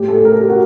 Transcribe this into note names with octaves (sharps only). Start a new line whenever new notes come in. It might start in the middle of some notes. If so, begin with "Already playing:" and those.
Already playing: A2 G4
A4
A#4
G4
F#4